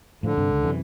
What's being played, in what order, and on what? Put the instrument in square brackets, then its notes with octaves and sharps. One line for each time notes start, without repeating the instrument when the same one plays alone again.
[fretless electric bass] A2 F3 [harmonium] D3
[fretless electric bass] G2 C3 G3
C#2
F#2 C3 E3